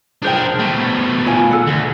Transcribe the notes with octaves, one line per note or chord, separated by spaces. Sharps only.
D4 G#4 A#4 C5 G5
B2 A3
F4 A#4 G#5
A4 F#5
D2